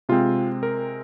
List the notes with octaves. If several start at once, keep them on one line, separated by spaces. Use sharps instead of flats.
C3 G#3 C4 F4
A#4